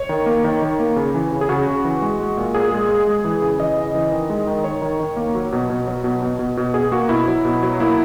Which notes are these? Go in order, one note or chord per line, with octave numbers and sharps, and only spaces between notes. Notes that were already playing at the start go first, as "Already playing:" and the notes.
Already playing: C#5
D#3
A#3
D#3
D#3
A#3
C#3
E3
C#3
G#4
C#3 F#4
C#3
E3
G#3
G#3
A#2
A#2 G#4
G#3
G#3
G#3
E3
C#3
E3 D#5
C#3
E3
D#3
G#3
D#3
D#3 C#5
D#3
D#3
A#3
F#3
B2
B2
F#3
B2
B2
B2
B2
B2 G#4
A#3 F#4
B2 E4
F#3
B2
F#3
A#3 E4